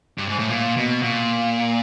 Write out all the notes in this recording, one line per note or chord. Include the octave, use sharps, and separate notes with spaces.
G2
G#2
A2
A#2
B2
A#2